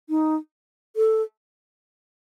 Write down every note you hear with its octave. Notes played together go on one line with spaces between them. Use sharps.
D#4
A4